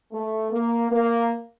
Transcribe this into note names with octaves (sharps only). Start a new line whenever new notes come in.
A3
A#3
A#3